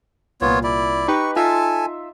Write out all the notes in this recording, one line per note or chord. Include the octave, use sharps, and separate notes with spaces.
C2 A#2 B3 F4 C#5
E4 D5
D#4 G4 B4 C#6
D#4 F4 A4 E5 G#5 A5